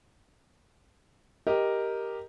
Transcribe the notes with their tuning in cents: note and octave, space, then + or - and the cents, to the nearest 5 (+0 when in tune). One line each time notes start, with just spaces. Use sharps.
G4 +0 A#4 +0 D#5 +0